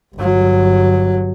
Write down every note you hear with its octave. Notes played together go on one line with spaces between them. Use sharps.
G1 F#3